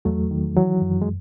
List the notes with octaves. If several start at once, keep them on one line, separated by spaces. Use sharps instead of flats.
E2 F#3 A3
D#3
E3 F#3
F#2
G#3